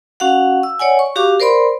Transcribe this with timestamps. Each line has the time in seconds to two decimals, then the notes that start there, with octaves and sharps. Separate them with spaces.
0.20 C#4 F#4 F5 F#5
0.63 E6
0.79 C#5 D5 F#5 G#5
0.99 C#6
1.16 F#4 G4 F5 D6
1.40 A#4 C5 D5 B5 C6